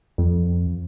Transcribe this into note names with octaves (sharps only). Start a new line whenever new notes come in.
F2